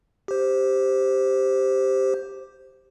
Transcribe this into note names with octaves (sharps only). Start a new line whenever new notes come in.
G4 C5